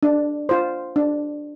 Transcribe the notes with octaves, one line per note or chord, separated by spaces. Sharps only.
D4
F4 C5
D4